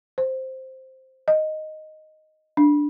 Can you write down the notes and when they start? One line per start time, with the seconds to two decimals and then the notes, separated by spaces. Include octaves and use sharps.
0.18 C5
1.28 D#5
2.57 D4